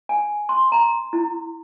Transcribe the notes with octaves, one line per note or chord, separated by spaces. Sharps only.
G#5
C6
A#5
E4